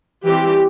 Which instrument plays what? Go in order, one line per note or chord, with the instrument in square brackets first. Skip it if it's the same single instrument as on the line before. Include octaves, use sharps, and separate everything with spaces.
[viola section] E3 G3 C4 G4